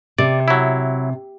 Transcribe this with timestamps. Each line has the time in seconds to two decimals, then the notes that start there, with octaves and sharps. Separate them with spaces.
0.18 C3 D5
0.48 F#3 E4